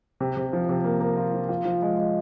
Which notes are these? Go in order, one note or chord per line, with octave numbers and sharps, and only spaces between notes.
C3
C3
F3
C3
A#3
A#3
F4
F3
F4
F3
G#3
G#3